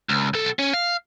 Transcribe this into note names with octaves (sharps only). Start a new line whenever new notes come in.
C#2
B1 A4
C#4
F5